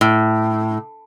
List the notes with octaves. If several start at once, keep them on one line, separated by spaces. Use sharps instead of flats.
A2